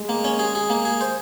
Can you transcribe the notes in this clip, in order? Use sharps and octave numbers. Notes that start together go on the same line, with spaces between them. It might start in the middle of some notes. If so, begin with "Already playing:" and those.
Already playing: G#3
A#3
C#4
G#4
G#4
A#3
G#4
C5